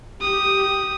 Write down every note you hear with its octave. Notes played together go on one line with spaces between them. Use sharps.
G4 D#6